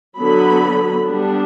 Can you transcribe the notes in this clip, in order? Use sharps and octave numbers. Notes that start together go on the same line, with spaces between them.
D3 F#3 B3 B5
G3 B3 D4